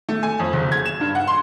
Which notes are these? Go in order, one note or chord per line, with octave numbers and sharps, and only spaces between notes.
A3
G#5
F2
F#1
G#6
E7
G2
F#5
C6